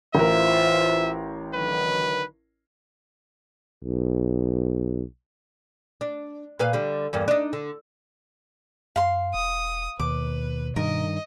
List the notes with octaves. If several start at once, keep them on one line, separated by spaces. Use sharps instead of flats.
A1 E3 F4 A#4 C5 E5
D3 D#3 F#3 B4
B1
D4
A#2 B4 F5
D3 G3
E2 G2 A#3
D4 D#4
D3
F#2 F5 C6
E1 D#6
D#2 B2 B4 D6
G2 D#3 A#4 D#5